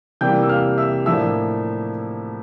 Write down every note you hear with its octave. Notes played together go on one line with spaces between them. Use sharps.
C3 E3 G3 A#3 G5 G6
E6
F5 F6
E5 E6
A2 F3 A#3 D4 E5 E6